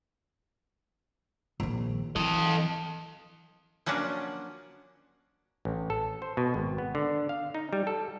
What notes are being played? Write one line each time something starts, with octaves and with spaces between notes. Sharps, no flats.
A#1 D#3
E3 A4 D#5
F3 F#3 A#3 C#4 D4
A1
A4
C5
B2
G#1
B3
D3
F5
D#4
G3
A4